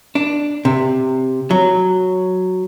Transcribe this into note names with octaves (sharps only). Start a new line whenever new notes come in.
D4
C3
F#3